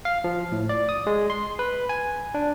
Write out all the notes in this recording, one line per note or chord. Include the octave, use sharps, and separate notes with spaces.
F5
F3
A2
D5
D#6
G#3
C6
B4
G#5
D4